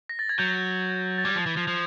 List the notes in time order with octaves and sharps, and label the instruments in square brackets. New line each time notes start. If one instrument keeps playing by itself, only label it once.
[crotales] A#6
A6
G#6
[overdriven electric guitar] F#3 [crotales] G6
[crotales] A6
[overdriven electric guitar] G3 [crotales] G#6
[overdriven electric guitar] F3
E3
F3
F3